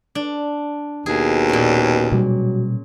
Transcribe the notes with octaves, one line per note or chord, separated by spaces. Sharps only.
D4
D#2 B2 G#4
A#2 C#4
B2 F#3 G3